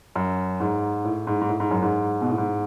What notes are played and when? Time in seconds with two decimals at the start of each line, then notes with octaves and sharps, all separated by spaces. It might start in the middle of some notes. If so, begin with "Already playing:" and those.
0.16 F#2
0.60 G#2
1.05 A2
1.27 G#2
1.41 G#2
1.49 A2
1.60 G#2
1.71 F#2
1.82 G#2
2.22 B2
2.30 A2
2.38 G#2